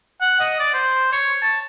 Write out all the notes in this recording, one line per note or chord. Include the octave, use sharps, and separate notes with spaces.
F#5
D#5
D5
C5
C#5
A5